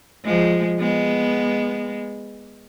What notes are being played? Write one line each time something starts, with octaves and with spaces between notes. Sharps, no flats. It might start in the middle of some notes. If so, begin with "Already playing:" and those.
F3 G#3
G#3 B3